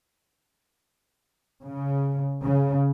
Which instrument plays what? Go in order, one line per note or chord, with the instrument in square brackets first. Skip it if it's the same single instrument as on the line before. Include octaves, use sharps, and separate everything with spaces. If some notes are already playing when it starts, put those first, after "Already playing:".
[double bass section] C#3
C#3